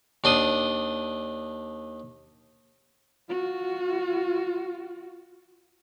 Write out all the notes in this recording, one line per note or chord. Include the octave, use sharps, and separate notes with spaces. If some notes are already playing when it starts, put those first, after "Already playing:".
D#2 D4 C6 D#6
F4 F#4